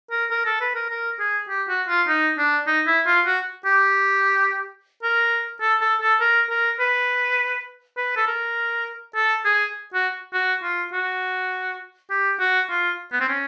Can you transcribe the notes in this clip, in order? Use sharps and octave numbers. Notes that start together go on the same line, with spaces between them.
A#4
A#4
A4
B4
A#4
A#4
G#4
G4
F#4
F4
D#4
D4
D#4
E4
F4
F#4
G4
A#4
A4
A4
A4
A#4
A#4
B4
B4
A4
A#4
A4
G#4
F#4
F#4
F4
F#4
G4
F#4
F4
B3
C4
C#4